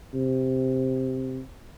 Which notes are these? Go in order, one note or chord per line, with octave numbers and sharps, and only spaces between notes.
C3